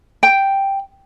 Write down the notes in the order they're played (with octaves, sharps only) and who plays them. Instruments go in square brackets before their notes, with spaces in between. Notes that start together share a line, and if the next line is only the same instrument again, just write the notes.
[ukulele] G5